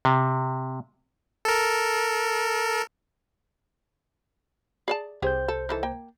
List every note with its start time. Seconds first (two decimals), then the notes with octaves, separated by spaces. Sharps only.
0.05 C3
1.45 A4 A#4
4.88 G#4 D5 A5
5.22 C2 C4 G4 G#4 C5 G6
5.48 A4
5.69 D#3 E3 A4
5.83 A#3 G5